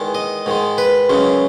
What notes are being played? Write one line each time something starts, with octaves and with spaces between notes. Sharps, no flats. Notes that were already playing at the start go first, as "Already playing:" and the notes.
Already playing: E2 D#3 G#3
D#5
G#2 D#3 G#3
B4
F#2 C#3 G#3